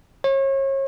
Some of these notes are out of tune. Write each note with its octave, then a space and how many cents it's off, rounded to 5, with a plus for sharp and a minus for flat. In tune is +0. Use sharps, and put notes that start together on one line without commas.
C#5 -35